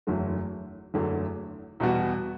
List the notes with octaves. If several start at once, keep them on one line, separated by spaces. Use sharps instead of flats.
F#1 E2 D3 F#3 A3
F#1 E2 D3 F#3 A3
E2 B2 G3 B3 F#4